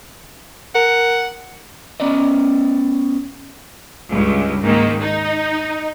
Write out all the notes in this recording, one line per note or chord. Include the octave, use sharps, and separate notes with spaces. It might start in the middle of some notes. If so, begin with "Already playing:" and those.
A#4 F#5
B3 C#4 D5 D#5
C#2 G2
G#2 D#3 A#3
D#4